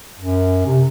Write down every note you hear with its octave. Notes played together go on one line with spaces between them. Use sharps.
F#2
C3